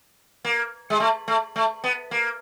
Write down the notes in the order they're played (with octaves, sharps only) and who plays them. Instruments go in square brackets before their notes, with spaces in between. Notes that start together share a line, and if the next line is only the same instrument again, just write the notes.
[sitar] A#3
G#3
A3
A3
A3
B3
A#3